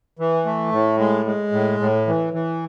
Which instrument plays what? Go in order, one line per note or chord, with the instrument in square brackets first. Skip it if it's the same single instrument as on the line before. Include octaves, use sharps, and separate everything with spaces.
[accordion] E3
A3
A2
G#3
G#3
A2
A2
E3
E3